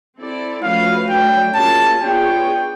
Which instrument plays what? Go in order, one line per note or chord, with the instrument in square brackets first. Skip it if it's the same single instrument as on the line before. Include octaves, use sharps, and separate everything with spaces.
[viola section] C4 E4 A4 D5
[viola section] F3 A3 C#4 F#4 B4 [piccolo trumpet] F5
[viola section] F#3 A3 D4 [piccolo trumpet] G5
[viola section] A#3 C#4 F4 G#4 [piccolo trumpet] A5
[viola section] B3 D4 F4 G#4 C#5 [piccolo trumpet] G5